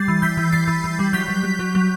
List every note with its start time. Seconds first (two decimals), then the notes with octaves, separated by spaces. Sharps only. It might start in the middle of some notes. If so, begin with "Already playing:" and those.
Already playing: G3 A6 C7
0.08 E3
0.22 E3 G6 B6
0.37 E3
0.52 E3 A6 C7
0.68 E3
0.84 E3
0.99 G3
1.13 F#3 G6 B6
1.28 F#3
1.43 F#3
1.59 F#3
1.75 F#3